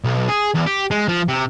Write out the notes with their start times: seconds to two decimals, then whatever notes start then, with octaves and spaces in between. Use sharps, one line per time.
0.04 B1
0.29 G#4
0.55 E2
0.67 G4
0.91 G#3
1.08 F3
1.29 C3